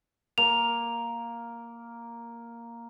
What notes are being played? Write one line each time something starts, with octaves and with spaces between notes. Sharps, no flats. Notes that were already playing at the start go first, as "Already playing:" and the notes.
A#3 F7